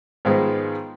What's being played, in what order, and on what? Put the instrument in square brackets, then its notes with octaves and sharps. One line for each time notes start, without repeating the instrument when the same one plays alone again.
[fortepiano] G#2 D#3 F3 G#3 B3